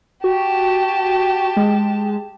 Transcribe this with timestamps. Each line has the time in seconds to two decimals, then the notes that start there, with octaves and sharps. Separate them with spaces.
0.24 F#4 G4 A5
1.57 G#3